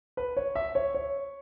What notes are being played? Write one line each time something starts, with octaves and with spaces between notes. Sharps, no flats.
B4
C#5
E5
C#5
C#5